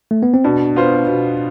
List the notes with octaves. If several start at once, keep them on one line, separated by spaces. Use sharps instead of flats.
A3
B3
C4
B2 D4
B3 F4 C5
B2